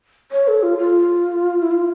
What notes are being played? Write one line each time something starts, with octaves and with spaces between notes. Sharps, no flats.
C#5
A4
F4
F4
E4
F4